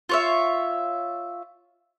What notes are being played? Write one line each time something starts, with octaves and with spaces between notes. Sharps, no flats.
F4 C#5 E5